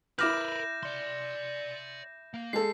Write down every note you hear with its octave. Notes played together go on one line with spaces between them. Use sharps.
E4 A#4 B4 D6 F6 G6 A#6 E7
D5 C6
A#3
G#3 A4 C7